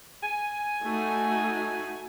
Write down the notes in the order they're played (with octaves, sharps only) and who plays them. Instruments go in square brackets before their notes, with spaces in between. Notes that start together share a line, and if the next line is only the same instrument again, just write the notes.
[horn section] G#5
[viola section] A3 D#4 F#4